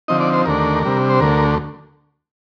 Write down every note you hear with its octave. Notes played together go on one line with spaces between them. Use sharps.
D3 F3 C4 D#4 D#5
D5
C5
D#2 D3 A3 D4 A#4
C3 G3 D4
C5
D2 D3 A3 A#4